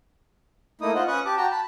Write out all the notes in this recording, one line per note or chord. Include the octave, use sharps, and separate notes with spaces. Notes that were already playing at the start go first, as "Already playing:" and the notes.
A3 A#3 D#4 E4 D#6
F4 C5 D#5 F#5
C#4 B4 C#6 D#6 F#6
G4 A5 D6
F#4 G5 A5 A#5
A5 B5